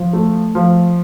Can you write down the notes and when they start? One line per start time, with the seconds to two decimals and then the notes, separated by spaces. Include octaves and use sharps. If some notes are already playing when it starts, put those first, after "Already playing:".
Already playing: F3
0.13 A3
0.55 F3